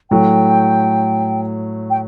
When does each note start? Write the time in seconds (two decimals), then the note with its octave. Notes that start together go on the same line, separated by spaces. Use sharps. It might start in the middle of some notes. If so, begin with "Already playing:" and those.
0.11 A2 F#3 A3 G5
1.90 G5